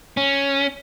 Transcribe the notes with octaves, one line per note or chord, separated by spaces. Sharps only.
C#4